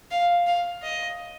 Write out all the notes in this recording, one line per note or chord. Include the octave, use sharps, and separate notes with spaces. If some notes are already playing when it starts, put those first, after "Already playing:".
F5
F5
D#5